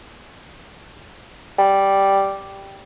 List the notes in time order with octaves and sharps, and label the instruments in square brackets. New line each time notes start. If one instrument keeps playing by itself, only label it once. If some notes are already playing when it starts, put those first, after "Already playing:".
[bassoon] G3